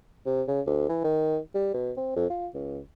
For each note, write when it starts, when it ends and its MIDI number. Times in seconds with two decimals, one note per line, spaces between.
0.26 0.42 48
0.48 0.61 49
0.67 0.89 38
0.89 1.00 52
1.04 1.39 51
1.54 1.70 55
1.74 1.92 47
1.97 2.15 60
2.16 2.27 41
2.30 2.47 65
2.54 2.80 37